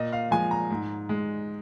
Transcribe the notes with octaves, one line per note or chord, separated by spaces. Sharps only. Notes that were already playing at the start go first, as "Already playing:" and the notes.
Already playing: A#2 D#5
F5
F3 G#3 G#5
A#5
G#2
G#3